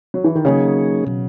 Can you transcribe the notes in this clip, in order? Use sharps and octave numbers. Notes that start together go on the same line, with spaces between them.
F#3
E3
D#3
C#3 F#3 A#3 D#4 G#4 C#5
B2 F#3